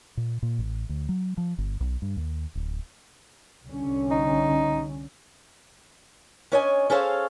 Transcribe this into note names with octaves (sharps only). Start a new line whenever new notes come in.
A#2
A#2
A1
D2
F#3
F3
G1
B1
G2
D#2
D1
C2 D3 C#4
D#4
C#4 D4 C#5 D#5 F5 G#5
C#4 G#4 A4 C5 C#5 F5